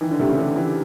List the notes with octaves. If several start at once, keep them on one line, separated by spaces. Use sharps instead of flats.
D#3 E3
D3
C3 A3
C#3
D3 E3
E3